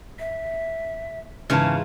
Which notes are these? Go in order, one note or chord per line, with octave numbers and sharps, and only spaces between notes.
E5
G#2 C#3 E3 F4 A#4 A5